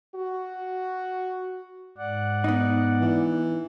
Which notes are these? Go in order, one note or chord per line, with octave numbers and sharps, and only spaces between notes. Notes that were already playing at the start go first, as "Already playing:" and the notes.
F#4
G#2 D5 F#5
B3 D#4
E3